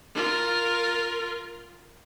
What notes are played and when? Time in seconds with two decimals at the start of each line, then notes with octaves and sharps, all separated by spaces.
0.15 F4 A#4